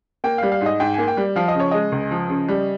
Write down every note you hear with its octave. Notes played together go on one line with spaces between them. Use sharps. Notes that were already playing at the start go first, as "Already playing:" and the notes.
A#3 G5
G3 F5
F5
G#2
D#5
G#2 G5
A#3 G#5
G5
G3
F3 F5
D#5
C#3 C#5
G#3 D#5
C#2
F3
C#3
G3